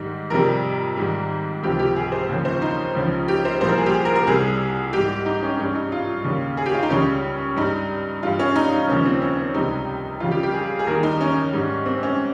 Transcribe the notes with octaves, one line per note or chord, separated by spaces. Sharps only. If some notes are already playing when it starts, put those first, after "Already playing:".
Already playing: G#2 D#3 G3
F2 C3 G3 A#4
G#2 D#3 G3
C#2 C3 F3 G4
G4
G#4
C5
D#2 C#3 F3
C5
D#4
C#2 C#3 F3
G4
C5
C2 A#2 F3 C5
A#4
G#4
G4
G#4
A#4
A#4
C2 C3 G3 G#4
G#2 G3 G4
D#4
C#4
G2 G3 C#4
D#4
F4
D#2 C#3 G3
G#4
G4
F4
D#4
C#2 C#3 G3 C#4
G2 G3 D#4
G2 G3 F4
C#4
D#4
D#4
D#2 C#3 F3 C#4
C4
C#4
C4
C#2 C3 G3 D#4
F2 C#3 G3 F4
G4
G4
G#4
G#4
D#2 D#3 G3 A#4
D#4
C#4
G#2 G3
C4
C#4